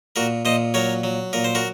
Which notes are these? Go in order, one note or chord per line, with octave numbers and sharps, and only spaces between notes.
A#2 F#4 A#4
A#2 C5 D#5
F#3 A#4 C#5
F#3
A#2 A#4
C5
F#4 A#4